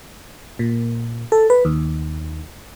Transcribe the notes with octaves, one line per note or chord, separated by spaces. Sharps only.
A#2
A4
B4
D#2